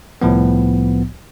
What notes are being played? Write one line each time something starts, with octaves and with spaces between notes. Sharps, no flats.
C2 A2 F3 B3